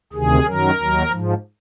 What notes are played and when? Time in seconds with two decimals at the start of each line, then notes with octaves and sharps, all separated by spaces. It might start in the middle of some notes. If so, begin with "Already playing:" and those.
0.13 D2 C3 D#3 G#4
0.45 F#2 D#3 F#3 A#4
0.77 D#2 D#3 F#3
1.08 G#2 F3